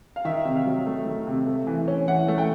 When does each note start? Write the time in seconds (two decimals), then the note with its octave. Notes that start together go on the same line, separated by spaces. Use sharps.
0.16 F5
0.25 D#3 E5
0.45 C3
0.56 F5
0.66 F#3
0.87 A3
1.06 D#3
1.27 C3
1.47 A3
1.67 E3
1.88 C#4
2.08 E3 F#5
2.28 A3
2.38 G5